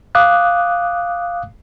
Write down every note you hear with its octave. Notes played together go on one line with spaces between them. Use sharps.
F5 D6 D#6 F#6